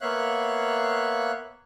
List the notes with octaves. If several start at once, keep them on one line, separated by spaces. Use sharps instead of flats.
A#3 B3 C#5 E5 F5 F#6